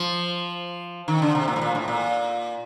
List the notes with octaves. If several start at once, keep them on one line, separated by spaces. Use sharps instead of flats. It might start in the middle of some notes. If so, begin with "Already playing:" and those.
Already playing: F3
D#3
D3
C3
A#2
A2
A#2
A2
A#2